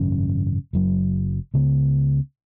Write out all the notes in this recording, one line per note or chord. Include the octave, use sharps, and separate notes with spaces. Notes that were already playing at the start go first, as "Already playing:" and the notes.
Already playing: G#1 F#2 C#3
F#1 F#2 F#3
C#2 C#3 B3